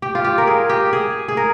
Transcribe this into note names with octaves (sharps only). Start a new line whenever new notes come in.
G4
F4
G4
A#4
G#4
G4
G#4
G#4
A#4